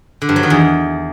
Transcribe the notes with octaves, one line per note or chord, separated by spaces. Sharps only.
D3
G2
F#3
D#3
E2